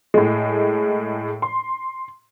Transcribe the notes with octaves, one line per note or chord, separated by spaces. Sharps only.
A2 G#3
C6